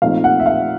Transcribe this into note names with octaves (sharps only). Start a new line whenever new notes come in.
A#2 F3 A3 C4 D#4 F5
F#5
E5
F5